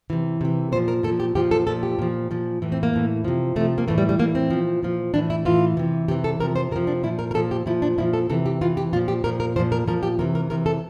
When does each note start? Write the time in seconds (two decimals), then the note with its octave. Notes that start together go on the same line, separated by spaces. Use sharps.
0.10 C3 E3
0.41 C3 E3
0.72 A#2 C5
0.76 F3
0.88 A#4
1.03 A#2 A4
1.08 F3
1.20 G4
1.35 A#2 F3 G4
1.51 A4
1.67 A#2 F3 A4
1.83 G4
1.99 A#2 F3
2.31 A#2 F3
2.62 A2 E3
2.72 C4
2.83 A#3
2.93 A2 E3
3.24 C3 F3
3.56 C3 F3 A3
3.78 A#3
3.88 A2 E3 A3
3.98 G3
4.09 G3
4.19 A2 A#3
4.22 E3
4.35 C4
4.50 A#2 F3
4.83 A#2 F3
5.14 A2 E3 D4
5.30 E4
5.45 A2 E3 F4
5.77 C3 E3
6.08 C3 G4
6.11 E3
6.24 A4
6.40 C3 F3 A#4
6.56 C5
6.71 C3 A#4
6.76 F3
6.87 D4
7.03 A#2 F3 E4
7.19 A#4
7.31 A#4
7.34 A#2 F3 A4
7.51 G4
7.66 A#2 F3 E4
7.82 D4
7.98 A#2 F3 E4
8.13 A4
8.30 C3 E3 A4
8.46 G4
8.61 C3 E3 F4
8.77 G4
8.93 A#2 F4
8.96 F3
9.08 G4
9.24 A#2 F3 A#4
9.40 A#4
9.56 A#2 F3 C5
9.72 A#4
9.87 A#2 F3 A#4
10.03 G4
10.19 C3 E3 A#4
10.35 A#4
10.50 C3 E3 A#4
10.66 A4